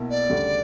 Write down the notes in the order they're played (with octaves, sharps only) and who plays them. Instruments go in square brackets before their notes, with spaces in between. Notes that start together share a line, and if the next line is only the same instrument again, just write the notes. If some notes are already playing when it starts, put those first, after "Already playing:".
Already playing: [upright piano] B1 B2 A#3 E4
[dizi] D5
[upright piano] D2 C#3 G3